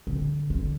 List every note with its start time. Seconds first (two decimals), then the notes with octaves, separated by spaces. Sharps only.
0.07 D3
0.50 D3